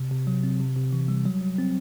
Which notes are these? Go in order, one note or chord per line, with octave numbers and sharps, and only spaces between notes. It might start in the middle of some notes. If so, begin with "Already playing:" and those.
Already playing: C3
C3
F#3
C4
C3
C3
E3
G3
F#3
F#3
C4